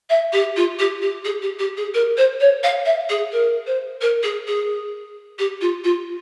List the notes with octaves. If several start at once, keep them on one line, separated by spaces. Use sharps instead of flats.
E5
G4
F4
G4
G4
G#4
G4
G4
G#4
A#4
C5
C#5
F5
E5
G#4
A#4
C5
A#4
G#4
G#4
G4
F4
F4